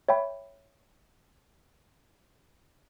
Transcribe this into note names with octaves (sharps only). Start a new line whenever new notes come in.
C#5 E5 G5 B5